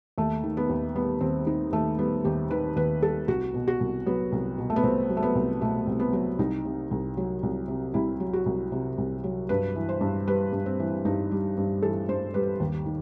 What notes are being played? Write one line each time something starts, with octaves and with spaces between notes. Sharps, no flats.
D#2 A3
D#3
B3
D#2
G3 B3
D#2 C4
D#3 D#4
D#2 A3
G3 B3
D#2 G4
D#3 B4
D#2 B4
G3 A4
C2 F#4
B2
F#4
C2
F#3 B3
C2
B2
A3
B3
C2 C4
F#3
A3
B3
C2
B2 A3
C2
B3
F#3
C2 D#4
C3
C2
F#3
C2
C3
C2 E4
F#3
F#4
C2
C3
C2
F#3
G2 B4
E3
C5
G2
G3 B4
G2
C4
E3
G2 D#4
G3
G2
E3 A4
G2 C5
G3 B4
D#2
D#3